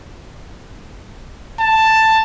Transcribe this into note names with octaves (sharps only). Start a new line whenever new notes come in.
A5